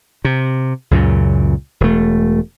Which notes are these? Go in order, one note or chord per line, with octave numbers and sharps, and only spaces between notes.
C3
C#2 F#2 A#2 C#3
E1 A3